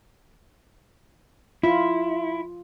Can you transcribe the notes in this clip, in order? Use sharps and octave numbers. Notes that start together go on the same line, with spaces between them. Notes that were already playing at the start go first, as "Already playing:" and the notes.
E4 F4